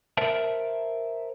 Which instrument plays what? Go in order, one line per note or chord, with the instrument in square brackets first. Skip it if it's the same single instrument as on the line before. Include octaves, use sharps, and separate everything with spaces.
[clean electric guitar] A#4 C5 E5 A5